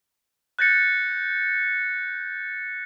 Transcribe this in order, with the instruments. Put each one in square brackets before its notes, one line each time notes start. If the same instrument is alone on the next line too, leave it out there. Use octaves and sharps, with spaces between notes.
[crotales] F#6 G6 A6 A#6 C#7